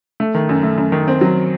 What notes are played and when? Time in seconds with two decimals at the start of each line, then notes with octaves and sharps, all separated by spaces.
0.20 A3
0.35 D#3
0.49 F#2
0.63 A3
0.78 F#2
0.92 D#3
1.08 C4
1.21 F#3